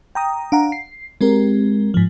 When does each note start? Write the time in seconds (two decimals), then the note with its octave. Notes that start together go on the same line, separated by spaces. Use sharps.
0.15 G5 A#5 D#6
0.52 D4 F5 F#5 A#5
0.72 C7
1.21 G#3 C4 G4 A#4
1.94 G#2 F3